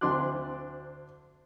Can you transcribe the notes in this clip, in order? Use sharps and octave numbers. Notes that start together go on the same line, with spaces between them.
D2 C4 D4 C6 D6 F#6